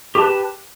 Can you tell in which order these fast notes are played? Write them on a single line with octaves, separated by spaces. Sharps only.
G4 A5 B4